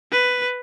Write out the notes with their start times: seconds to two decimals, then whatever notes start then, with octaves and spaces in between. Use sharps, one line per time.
0.12 B4